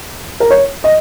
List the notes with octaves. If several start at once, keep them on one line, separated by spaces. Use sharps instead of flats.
A#4
C#5
D#5